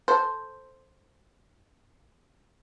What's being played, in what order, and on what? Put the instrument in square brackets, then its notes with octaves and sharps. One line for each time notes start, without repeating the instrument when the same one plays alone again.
[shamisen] A4 C5